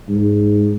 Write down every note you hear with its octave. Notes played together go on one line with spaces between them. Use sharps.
G#2